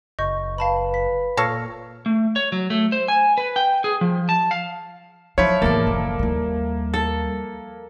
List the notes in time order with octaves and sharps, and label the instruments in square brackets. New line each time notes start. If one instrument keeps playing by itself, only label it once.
[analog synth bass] F#1 [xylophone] D#5 C#6 G6
[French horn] B4 [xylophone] F5 A5 B5
[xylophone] B6
[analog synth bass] A#2 [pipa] A4 C#5 F5 [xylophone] A#6
[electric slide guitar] A3
C#5
F#3
A3
C5
G#5
B4
G5
G#4
F3
A5
F5
[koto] F3 E4 [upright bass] F#3 [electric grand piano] C#5
[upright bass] A1 E2 [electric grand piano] A#3 [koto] A4 D5
[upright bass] F#1
D#2 G3
[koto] A4